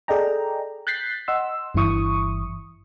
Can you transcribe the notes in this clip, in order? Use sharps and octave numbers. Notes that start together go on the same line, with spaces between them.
G#4 A4 D5 D#5 G5 A#5
F#6 G6 A6 B6 C7
D#5 F#5 C6 E6
G1 G2 E3 E4 C#6 D#6